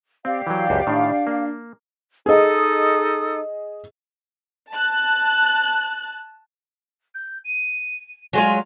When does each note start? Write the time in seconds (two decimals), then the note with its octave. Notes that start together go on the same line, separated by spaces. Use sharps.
0.25 C4 G4 D5 F5
0.47 E3 F#3 G5
0.70 C#2 F#2 F#4
0.87 A2 D#3 D4
1.27 A#3
2.26 D#4 G#4 A4 D#5 D#6
4.74 A5 F#6
7.14 G6
7.45 D#7
8.33 F#3 G#3 F4 G#5